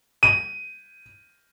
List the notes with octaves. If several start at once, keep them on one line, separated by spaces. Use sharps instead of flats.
D#7